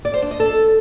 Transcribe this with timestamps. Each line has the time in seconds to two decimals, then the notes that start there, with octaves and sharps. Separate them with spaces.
0.05 D5
0.14 C5
0.22 D4
0.31 D#5
0.40 A4